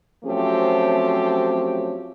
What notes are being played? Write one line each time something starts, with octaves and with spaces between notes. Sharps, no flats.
F3 F#3 A3 C4 C#4 G4